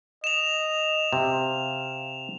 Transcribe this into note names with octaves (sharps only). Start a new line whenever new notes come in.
D#5 E7 F7
C3 F5